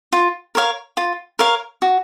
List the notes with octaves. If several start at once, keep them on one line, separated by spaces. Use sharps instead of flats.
F4
A#4 C#5 F5
F4
A#4 C#5 F5
F#4